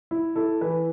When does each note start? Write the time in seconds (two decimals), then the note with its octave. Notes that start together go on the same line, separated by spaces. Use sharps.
0.11 E4
0.36 E4 A4
0.61 E3 B4